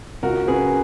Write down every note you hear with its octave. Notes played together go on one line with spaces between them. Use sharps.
C#2 F#4 A#4
C#3 G#4 B4